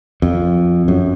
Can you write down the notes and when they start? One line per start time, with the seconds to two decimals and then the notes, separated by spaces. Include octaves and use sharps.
0.22 F2
0.88 F#2